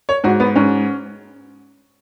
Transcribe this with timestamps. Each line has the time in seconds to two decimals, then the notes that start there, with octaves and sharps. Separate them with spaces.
0.09 C#5
0.24 G#2 F#4
0.40 B3
0.56 G#2 C#4